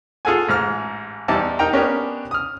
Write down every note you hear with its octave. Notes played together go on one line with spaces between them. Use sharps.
F4 G#4 A4 F#5 G#5
A1 G#2 F6
E2 G3 D#4 D5 E5 A5
D#4 A#4 G5 A#5
B3 C#4 D4 G4 A#4
D#6 F6